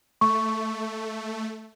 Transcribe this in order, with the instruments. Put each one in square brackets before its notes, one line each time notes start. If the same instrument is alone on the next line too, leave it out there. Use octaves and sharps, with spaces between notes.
[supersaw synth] A3 [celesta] C#6